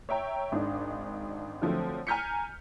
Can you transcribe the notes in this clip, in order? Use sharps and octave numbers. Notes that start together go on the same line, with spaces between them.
C#5 E5 G5 A#5
G#1 D4 D#4
D3 F3 F#3 A3 C4
G#5 A#5 F6 G6 B6 C#7